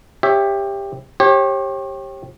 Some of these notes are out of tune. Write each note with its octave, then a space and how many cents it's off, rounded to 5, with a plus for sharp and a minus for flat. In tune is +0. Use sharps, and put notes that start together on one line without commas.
G4 +15 C#5 -5 E5 +0
G4 +0 C#5 -40